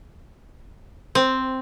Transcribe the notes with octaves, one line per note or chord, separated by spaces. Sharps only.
C4